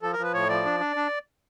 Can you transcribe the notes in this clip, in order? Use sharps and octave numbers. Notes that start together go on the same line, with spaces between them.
F3 A4
A#4
F3 B4
A2 C#5
F3 D5
D4
D4
D4